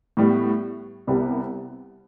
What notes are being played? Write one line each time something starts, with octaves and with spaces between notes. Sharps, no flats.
A2 G3 B3
C2 C3 G3 B3